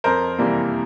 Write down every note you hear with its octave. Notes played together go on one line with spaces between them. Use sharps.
F2 A#4 C5
C3 E3 G3 A#3